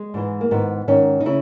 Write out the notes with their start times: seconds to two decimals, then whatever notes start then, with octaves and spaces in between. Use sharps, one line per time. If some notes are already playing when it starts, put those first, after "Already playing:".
Already playing: G#3
0.14 G#2 E3
0.41 A#3
0.51 G#2 D#3 B3
0.88 G#2 D#3 C#4
1.21 D#4
1.26 C#3 E4